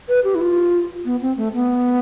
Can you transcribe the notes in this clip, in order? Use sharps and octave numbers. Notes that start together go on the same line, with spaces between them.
B4
G4
E4
F4
B3
C4
A3
B3